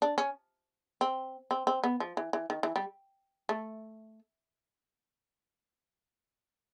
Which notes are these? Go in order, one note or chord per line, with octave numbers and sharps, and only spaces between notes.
D4
C#4
C4
C4
C4
B3
F3
E3
E3
D#3
E3
G3
A3